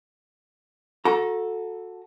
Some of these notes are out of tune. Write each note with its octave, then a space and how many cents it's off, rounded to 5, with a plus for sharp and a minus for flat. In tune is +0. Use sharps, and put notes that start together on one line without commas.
F#4 -25 A4 +0 A#5 +20